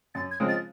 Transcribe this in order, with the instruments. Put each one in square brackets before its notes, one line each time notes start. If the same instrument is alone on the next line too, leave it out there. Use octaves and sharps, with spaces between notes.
[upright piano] F#2 [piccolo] A6
[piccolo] G#6
[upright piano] C#3 F3 G#3 C4
[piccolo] A6